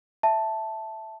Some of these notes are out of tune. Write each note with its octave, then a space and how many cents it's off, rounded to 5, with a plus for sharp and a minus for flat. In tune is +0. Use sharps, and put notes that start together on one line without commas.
E5 +0 A5 +0